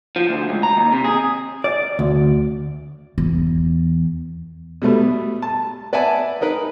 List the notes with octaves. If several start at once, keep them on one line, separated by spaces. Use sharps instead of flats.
F3
D2
C#2
A#5
D#2
C3
G#4
D5
D2
E2
B2 G3 A3 B3
A5
B4 D5 E5 F#5 G#5 A5
D#4 A#4 B4